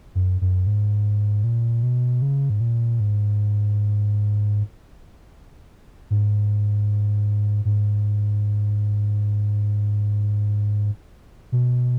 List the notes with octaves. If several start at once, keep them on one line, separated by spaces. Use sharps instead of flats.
F#2
F#2
G#2
A#2
B2
C#3
G#2
A#2
G#2
G#2
G#2
B2